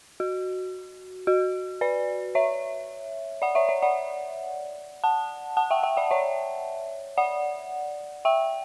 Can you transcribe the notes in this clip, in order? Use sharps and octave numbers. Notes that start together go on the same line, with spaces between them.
F#4
F#4
B4 D5
C#5 E5
D5 F#5
C#5 E5
C#5 E5
D5 F#5
F#5 A5
F#5 A5
E5 G5
E5 G5
D5 F#5
C#5 E5
D5 F#5
E5 G5